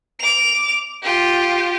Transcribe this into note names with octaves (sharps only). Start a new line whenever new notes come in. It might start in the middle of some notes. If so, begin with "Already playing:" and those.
D6 F7
F4 G4